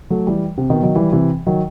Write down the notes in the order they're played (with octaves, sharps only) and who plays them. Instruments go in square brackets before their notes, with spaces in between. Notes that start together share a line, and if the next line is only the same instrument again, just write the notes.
[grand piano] F#3 A3
E3 G3
C3
B2 D#3
D#3 F#3
E3 G3
C3 E3
D#3 F#3